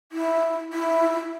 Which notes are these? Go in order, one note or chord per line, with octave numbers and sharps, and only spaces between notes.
E4
E4